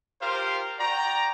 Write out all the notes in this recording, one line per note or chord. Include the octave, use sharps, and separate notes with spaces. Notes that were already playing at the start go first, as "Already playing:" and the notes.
F4 G4 A#4 C5 F5
F#4 D5 G5 A#5